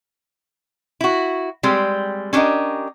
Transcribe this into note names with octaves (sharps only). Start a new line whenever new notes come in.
E4 F#4
G3 G#3 C4 G4
C#4 D4 G4 A#4 D#5